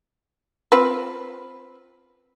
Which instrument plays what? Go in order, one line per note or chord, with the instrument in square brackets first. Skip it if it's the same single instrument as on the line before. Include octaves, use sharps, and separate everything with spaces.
[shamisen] C4 F4 B4